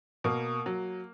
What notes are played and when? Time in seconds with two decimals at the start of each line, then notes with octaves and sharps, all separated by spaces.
0.24 B2 A#3
0.66 F#3